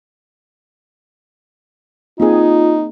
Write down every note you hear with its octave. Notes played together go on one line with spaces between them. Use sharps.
A#3 C4 D#4 F4 G#4